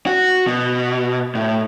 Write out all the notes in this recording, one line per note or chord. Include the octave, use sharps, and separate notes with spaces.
F#4
B2
A2